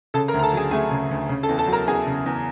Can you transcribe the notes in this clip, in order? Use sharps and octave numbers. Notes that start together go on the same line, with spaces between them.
C#3 A4 A5
A#4 A#5
D2
A#5
A4 A5
F#3 G#4 G#5
A3 G#4 G#5
C#3
D2
C#3
A4 A5
E2
A4 A5
F#3
A#4 A#5
E2 G#4 G#5
C#3
E2